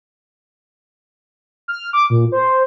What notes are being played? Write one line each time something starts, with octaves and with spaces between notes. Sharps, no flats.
F6
D6
A#2
C5